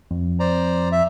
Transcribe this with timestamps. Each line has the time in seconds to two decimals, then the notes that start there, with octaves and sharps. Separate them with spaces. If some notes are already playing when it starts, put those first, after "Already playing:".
0.11 F2
0.40 C5 D5 A#5
0.92 E5